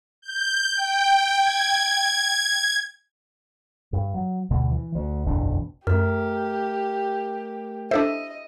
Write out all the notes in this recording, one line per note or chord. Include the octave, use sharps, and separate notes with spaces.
G6
G5
G#6
G2
F#3
D2 B2 D3
E3
D2
F#1 B1 E2 D4
F#2 A3 G4 A#4
D4 A4 C5 D#5 E5